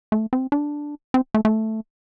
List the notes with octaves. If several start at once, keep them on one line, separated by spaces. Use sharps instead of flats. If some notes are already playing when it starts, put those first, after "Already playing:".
A3
C4
D4
C4
A3
A3